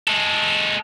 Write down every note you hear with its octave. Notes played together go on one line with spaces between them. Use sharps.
G#3 A4